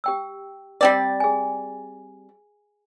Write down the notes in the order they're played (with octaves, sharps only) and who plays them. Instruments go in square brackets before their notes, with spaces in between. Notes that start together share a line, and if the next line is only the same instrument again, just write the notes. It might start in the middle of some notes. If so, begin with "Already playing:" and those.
[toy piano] G4 G5 E6
[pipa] G3 C4 D5
[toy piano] G#4 G#5